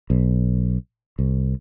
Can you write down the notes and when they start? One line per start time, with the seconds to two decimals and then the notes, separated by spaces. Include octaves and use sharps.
0.10 B1
1.19 C2